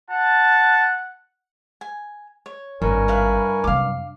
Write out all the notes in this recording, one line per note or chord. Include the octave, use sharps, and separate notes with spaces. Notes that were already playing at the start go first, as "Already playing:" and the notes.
F#5 A5
G#5
C#5
G#1 G2 A#4 G#5 C#6
E4 B4 F5
F#2 C3 F5 D6